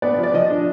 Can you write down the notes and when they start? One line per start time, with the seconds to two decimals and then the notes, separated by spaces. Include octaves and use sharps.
0.02 B3 D5
0.18 F3
0.23 D5
0.34 F3 D#5
0.50 D4